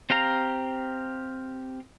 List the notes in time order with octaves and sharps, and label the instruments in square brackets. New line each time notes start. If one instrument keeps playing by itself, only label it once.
[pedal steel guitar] C4 G4 F5 A#5